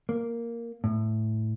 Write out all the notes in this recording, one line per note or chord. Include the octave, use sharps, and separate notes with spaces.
A#3
A2